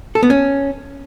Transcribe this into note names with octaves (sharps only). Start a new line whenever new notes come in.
A4
B3
C#4